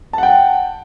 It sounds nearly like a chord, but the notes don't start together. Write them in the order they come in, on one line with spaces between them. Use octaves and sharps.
A5 F#5 G5